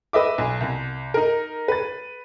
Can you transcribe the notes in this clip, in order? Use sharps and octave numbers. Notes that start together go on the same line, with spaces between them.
B4 D#5 E5 D6
B1
C2
D#4 A#4
B4 A6